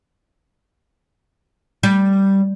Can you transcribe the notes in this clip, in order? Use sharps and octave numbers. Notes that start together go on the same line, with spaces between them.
G3